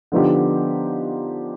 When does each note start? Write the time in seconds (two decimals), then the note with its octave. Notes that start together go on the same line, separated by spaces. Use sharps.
0.12 D3 F3 B3 D#4 G4